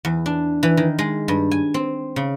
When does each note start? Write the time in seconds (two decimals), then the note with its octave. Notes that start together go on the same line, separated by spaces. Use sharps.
0.05 E2
0.26 D4
0.63 E3
0.77 D#3
0.99 G#3
1.28 G2
1.51 G#5
1.74 C4
2.16 C#3